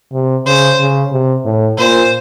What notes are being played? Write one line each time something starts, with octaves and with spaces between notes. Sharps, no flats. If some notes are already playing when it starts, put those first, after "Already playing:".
C3
C#3 C5
C#3
C3
A2
A#2 C5